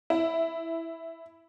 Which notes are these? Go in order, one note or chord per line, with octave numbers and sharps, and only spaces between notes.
E4